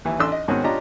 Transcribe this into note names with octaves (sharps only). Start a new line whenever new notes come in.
D#2 E3
A1 D4 C6 E6
D#5
G#2 B2 D#3 C4 C#4 F#4
C#4 D4 F4 G4 D#5 A#5